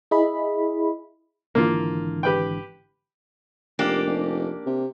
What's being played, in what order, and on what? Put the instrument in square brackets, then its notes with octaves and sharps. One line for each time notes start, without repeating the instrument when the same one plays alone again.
[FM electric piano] E4 G#4 D#5 E5 B5
[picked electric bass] G#1 D3 E3 [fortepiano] A#3 F4
[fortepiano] G4 B4 G5
[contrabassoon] F1 [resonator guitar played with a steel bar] A#3 D4 G4
[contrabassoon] F1
C3